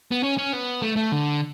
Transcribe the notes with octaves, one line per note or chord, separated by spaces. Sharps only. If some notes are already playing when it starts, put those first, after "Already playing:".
B3
C#4
C#4
B3
A3
A3
D3